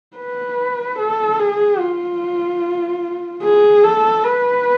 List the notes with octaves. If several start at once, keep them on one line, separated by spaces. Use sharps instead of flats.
B4
A4
G#4
F4
G#4
A4
B4